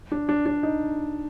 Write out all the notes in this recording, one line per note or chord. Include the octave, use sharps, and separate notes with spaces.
D4
D4
D4
D#4